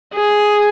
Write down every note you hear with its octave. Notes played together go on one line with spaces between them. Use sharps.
G#4